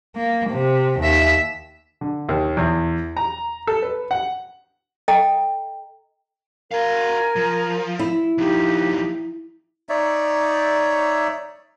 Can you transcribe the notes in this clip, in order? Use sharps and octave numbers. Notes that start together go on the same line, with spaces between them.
A#3
C3
D#2 E5
D3
D#2
E2
A#5
A4
B4
F#5
A4 D#5 G5 A#5
F#4 A#4 F5 G#5
F3
E4
D#2 F3 D#4 G4
D#4 C#5 D5 E5